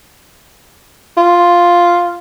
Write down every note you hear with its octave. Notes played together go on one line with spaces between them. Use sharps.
F4